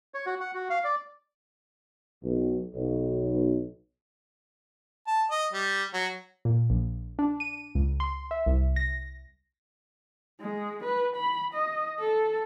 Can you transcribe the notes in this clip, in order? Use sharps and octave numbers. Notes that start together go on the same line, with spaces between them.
C#5
F#4
F#5
F#4
F5
D5
B1
B1
A5
D#5
G3
F#3
A#2
A#1
D4
D#7
C#2
C6
E5
C2
A#6
G#3
B4
B5
D#5
A4